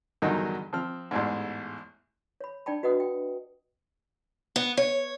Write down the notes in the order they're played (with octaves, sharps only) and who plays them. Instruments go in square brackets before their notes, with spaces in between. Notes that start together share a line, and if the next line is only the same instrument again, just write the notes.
[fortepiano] E2 G2 D3 D#3 F#3 D#4
F3 C4 F6
A1 E2 G#2
[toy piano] C#5 B5
D4 D5 G5 A5 B5
F#4 B4 D#5 F#5 D#6
G5
[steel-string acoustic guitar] B3
C#5